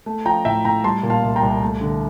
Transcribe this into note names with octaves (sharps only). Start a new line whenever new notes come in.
A3
F3 G5 A#5
A2 E5 G5
A2 G5 A#5
G3 A5 C6
A#2
F5 A5
C2
G5 A#5
C2
A3
D3